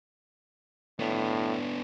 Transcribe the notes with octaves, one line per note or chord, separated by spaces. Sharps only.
A2 B3 D4